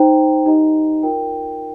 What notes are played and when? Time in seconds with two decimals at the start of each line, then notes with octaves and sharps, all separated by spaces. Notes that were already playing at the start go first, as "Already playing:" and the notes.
Already playing: D#4 C5 G5 A#5
0.46 D#4 G4 D#5 A#5
1.03 F4 A#4 G5